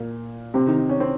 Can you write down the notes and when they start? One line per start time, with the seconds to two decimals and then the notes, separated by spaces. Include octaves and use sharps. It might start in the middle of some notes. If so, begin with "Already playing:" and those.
Already playing: A#2 A#3
0.54 C3 C4
0.67 D#3 D#4
0.79 D#4
0.89 C#4
1.00 C4